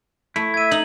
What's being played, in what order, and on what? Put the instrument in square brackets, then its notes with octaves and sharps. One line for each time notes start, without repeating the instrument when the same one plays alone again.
[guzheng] A3 [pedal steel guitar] E4
[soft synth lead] E5 [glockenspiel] G#6 D#7
[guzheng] D#4 [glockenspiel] F#7